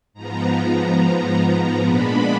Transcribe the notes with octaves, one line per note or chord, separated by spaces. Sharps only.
G#2 F3 B3 A#5
A#2 G#3 B3 D4 B5